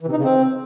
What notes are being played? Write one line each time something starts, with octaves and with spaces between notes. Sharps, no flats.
E3
C3
D#4
C#3
C4